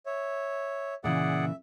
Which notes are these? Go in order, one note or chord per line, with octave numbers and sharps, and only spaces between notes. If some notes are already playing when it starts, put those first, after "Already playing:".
C#5 E5
A#2 C#3 E3 G#4 D5 E5 F#5